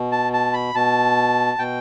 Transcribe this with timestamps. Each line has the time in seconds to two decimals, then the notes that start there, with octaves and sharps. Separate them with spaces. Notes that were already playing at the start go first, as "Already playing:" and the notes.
Already playing: B2
0.12 A5
0.33 A5
0.53 B5
0.75 B2 A5
1.58 B2 G5